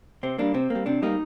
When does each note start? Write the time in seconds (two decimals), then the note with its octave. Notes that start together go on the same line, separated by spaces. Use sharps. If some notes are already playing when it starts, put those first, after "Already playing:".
0.23 C3 C4
0.38 G3 A#3 D4
0.54 C3 C4
0.70 A#3
0.75 G3
0.86 C3 D4
1.02 G3 A#3 D#4